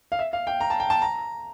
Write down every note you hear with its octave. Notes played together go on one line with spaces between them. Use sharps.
F5
E5
F5
G5
A#5
A5
G5
A5
A#5